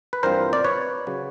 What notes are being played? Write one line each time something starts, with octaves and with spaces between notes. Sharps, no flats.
B4
G2 E3 G3 C4 F4 A#4 C5
D5
B4 C#5
C#3 F#3